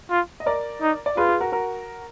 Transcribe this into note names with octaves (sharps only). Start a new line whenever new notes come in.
F4
D#5
A#4 D5
D#4
D5
F4 G#4 B4
G#4 B4
F#4 A#4
F#4 A#4